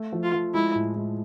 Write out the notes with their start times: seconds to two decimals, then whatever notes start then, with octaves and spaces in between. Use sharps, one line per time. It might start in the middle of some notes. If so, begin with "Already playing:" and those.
Already playing: A3
0.12 F3
0.23 F4
0.33 F3
0.54 G#3 E4
0.75 A2
0.96 G#3